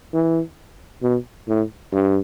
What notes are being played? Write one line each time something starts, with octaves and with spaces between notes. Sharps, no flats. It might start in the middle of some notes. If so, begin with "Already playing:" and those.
E3
B2
A2
G2